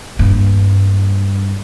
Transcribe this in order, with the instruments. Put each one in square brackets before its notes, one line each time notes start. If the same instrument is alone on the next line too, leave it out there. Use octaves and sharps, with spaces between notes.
[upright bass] G2 A#3